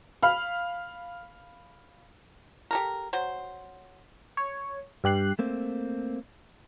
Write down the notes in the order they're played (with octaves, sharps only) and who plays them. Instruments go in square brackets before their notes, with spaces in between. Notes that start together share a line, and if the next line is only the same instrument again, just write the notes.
[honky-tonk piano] F5 B5 F6
[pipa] G4 A4 A#4
F#3 C5
[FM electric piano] C#5
G2 G4 F#6 C7
[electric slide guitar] A3 A#3 C4